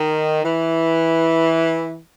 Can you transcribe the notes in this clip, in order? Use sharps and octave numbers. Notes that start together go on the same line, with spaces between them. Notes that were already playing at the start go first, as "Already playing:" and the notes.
Already playing: D#3
E3